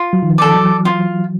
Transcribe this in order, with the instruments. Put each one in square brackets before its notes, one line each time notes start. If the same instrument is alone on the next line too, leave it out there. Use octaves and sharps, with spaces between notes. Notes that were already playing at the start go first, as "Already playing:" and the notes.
Already playing: [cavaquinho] F4
[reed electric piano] F#3
D#3 F3
[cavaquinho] A4 D5
[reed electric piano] E3 F#3
[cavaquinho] F4